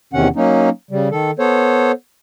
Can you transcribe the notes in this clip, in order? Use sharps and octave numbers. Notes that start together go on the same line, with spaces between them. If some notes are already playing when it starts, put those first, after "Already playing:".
E2 C3 D#3 C#4 F#5
F#3 A#3 C#4 D#4
C#3 G3
D#3 A4
B3 A4 C5 C#5